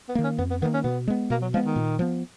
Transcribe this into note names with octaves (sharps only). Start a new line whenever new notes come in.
B3
D#3 A#3
C#4
F2 B3
B3
D#3 A#3 B3
C#4
B2 B3
G#3 B3
B2 A#3
F#3
F3 G#3 B3
D#3
A#2
F3 B3